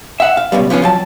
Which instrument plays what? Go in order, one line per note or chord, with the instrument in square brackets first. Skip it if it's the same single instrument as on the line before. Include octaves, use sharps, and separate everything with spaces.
[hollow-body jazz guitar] E5 F#5
F5
C#2 F#2 B2 G3
F3 B3 C#4 F4
F2 F#3 A5